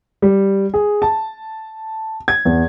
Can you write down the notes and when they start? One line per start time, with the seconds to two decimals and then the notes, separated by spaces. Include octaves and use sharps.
0.22 G3
0.74 G#4
1.02 A5
2.28 G#6
2.45 E2